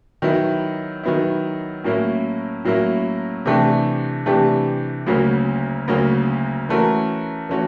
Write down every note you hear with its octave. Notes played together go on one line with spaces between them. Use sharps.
D#3 F#3 B3 E4
D#3 F#3 B3 E4
A2 F#3 A#3 C#4 E4
A2 F#3 A#3 C#4 E4
C3 E3 A3 D4 G4
C3 E3 A3 D4 G4
D2 C#3 F#3 A#3 C#4
D2 C#3 F#3 A#3 C#4
E3 A3 C#4 F#4 A#4
E3 A3 C#4 F#4